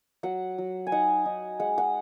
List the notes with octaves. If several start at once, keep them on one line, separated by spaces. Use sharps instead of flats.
F#3 F#5
F#3
G#5
D#4 F#5
D#4
G#3 F#5
F#5